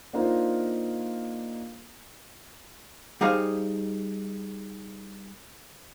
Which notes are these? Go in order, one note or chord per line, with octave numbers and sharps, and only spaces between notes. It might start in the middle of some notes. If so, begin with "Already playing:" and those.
A#3 D4 D#4 F4 A#4 C5
G3 D#4 G#4 C5 D#5 F5